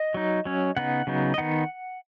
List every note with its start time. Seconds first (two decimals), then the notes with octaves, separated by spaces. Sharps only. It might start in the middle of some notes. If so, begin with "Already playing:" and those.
Already playing: D#5
0.14 F#3 D#4
0.45 F#3 C#4
0.76 C#3 B3 D#4 F#5
1.07 C#3 F#3 B3 D#4
1.34 D#5
1.38 D#3 B3 D#4 F#5